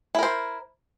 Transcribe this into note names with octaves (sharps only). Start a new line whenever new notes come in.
E4 A#4 C5